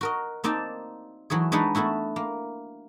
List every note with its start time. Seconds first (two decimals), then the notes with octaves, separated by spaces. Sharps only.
0.01 F#4 A#4 D#5
0.44 A#3 C4 D#4 D5 D#5 A5
1.30 E3 F#3 A3 G#4
1.52 G#3 D4 D#4 B4 C#5 F#5
1.75 A3 B3 E4 F#4
2.16 A#3